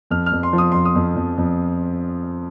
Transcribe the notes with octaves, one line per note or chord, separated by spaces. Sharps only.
F2 F6
F6
F2
C6
F3
D#6
F2 C6
D#6
F2
F2
F2